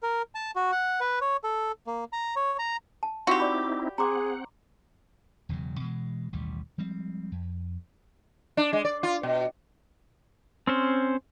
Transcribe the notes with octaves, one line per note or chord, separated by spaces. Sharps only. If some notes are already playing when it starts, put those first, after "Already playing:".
A#4
A5
F#4
F#5
B4
C#5
A4
A#3
A#5
C#5
A#5
A5
C4 D#4 E4 F#4 G4 F5 C6 D6
D5 B5 D6
C4 G#4 F#5 A#5 C6 D6
E1 E2 C#3 F#3
B2 E3 G#3
A1 D#2 B2 G3
F3 G3 G#3 C4
F2
D4
G#3
D5
F4
B2
C4 C#4 C5